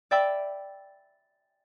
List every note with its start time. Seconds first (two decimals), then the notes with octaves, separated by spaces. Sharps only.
0.11 D5 E5 G5 B5 E6